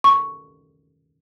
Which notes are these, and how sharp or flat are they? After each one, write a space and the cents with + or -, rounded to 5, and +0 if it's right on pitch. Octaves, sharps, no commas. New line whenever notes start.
C#6 +5